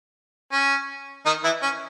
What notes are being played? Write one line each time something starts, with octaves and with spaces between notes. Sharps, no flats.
C#4
D#3 D#4
E3 E4
C#4